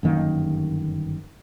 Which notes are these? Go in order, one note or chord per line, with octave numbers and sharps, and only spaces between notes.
G1 F#2 D#3 A#3